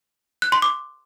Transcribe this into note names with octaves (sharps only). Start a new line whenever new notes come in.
F#6
C6
D6